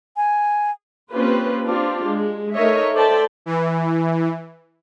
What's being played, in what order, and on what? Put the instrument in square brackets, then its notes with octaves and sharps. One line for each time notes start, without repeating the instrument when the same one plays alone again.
[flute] G#5
[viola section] A#3 C4 C#4 F4 G4 B4
C4 D4 F4 G4
G#3
A3 D#4 A#4 C#5 D#5 E5
A4 C5 D5 E5 G5 A5
[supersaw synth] E3